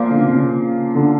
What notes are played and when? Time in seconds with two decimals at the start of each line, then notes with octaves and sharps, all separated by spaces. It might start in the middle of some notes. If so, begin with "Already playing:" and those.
Already playing: A#2 F3 A#3
0.10 D3
0.18 C#3
0.25 C3
0.34 C#3
0.95 D3